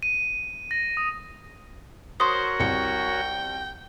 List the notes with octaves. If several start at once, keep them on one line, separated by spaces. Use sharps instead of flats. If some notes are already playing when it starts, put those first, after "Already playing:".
D#7
A#6
D#6
F#4 A#4 C5 C#5 C6 D#6
C2 G5 C#7